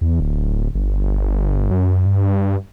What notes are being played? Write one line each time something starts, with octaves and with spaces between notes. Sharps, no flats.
E2
D1
G1
F#2
G2